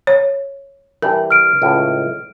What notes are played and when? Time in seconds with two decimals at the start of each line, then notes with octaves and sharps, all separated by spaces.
0.07 C#5
1.02 E3 G3 D4 A#4
1.31 F6 D7
1.62 C#2 A2